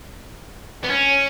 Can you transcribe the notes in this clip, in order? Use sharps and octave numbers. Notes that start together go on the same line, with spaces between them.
B3
C#4